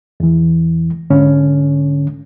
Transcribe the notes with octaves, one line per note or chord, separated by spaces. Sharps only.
E2 E3
G#2 D3 C#4